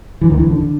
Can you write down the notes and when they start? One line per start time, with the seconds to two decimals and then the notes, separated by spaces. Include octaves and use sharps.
0.21 E3
0.30 D2 D#3
0.40 E3
0.50 D3
0.60 D3